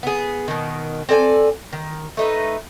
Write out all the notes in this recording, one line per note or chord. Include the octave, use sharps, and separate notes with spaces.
B3 G#4
B2 D#3
C4 A4 D5 G#5
D#3
A3 D#4 B4